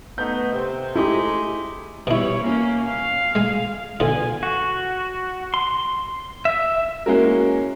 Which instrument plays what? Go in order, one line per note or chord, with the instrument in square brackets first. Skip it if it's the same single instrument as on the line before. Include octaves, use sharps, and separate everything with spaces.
[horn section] A3 B3 D#4 [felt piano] G6
[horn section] C3 C4
[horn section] G#3 A3 D#4 [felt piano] E4 G4
[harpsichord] B2 E4 [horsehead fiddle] G3 C#5
[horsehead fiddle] A#3 C#4
F5
[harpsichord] G#3 G#5
[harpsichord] B2 D3 F4 [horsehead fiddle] G#5
[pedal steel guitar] F#4
C6
E5
[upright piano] G#3 A#3 C#4 E4 F#4 A#4